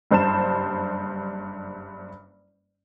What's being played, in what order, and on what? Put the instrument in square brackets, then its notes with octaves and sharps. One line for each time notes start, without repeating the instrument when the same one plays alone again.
[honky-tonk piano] F#1 G2 C5 A5 E7